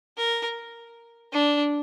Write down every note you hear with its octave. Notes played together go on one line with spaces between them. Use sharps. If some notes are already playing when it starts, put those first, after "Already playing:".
A#4
D4